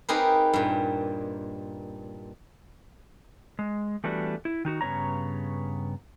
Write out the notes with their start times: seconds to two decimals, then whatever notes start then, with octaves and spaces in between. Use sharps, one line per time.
0.09 C4 D#4 G4 G#4 A#4 B4
0.53 G2 A#2
3.59 G#3
4.04 E3 G3 A3 B3 D4 F#4
4.45 E4
4.65 D#3 D#4 F#4
4.81 G2 C#3 B3 C#5 A#5